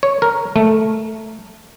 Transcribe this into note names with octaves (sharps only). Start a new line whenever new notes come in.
C#5
A#4
A3